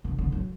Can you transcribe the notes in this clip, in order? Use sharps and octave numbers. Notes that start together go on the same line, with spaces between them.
D3
D3
F#3